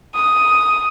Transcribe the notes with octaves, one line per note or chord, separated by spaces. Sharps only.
D#6